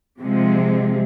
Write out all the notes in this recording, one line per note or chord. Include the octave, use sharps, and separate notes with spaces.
C3 F3 G#3